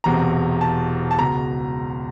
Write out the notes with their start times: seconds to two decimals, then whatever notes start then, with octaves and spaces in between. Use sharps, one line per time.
0.04 E1 E2 C3 A#5
0.61 A5
1.11 A5
1.18 C#2 B2 A#5